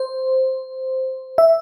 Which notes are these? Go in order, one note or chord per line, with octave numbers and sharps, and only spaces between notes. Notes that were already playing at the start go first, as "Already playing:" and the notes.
Already playing: C5
E5